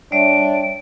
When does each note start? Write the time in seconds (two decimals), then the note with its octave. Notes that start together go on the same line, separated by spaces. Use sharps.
0.12 G3 D4 C#5 E5 D7